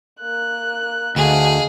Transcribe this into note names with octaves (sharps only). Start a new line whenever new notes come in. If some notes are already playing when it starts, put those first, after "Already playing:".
A#3 F#6
D2 G#4 D#5 F5